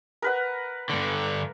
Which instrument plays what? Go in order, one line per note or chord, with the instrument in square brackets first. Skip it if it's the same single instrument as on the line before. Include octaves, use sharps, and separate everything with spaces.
[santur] A#4 B4 F#5
[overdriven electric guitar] G2 D3